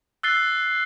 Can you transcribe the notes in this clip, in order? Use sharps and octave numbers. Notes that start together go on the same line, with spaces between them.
E6 F#6 A6 C7 G7